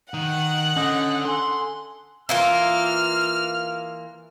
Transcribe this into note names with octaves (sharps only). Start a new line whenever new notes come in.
D#3 F#5
D3 C#4 D#5 D#6
A4 G#5 C6
E3 A#3 F4 F6